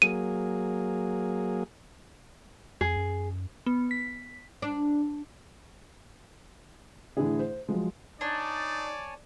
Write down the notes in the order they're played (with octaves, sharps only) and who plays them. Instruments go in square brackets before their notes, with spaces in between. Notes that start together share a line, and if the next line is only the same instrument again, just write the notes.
[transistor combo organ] F#3 A#3 G#4 [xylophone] D#7
[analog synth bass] F2 [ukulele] G#4
[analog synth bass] F#2
[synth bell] B3
B6
[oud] D4
[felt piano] A2 D3 E3 D4 E4 G#4
C5
F3 F#3 G#3
[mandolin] D4 [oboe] D#4 [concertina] C#5 G#5 A5 [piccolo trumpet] D5